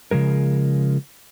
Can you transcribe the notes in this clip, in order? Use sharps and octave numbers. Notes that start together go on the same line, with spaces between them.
C#3 F3 G#3 A#4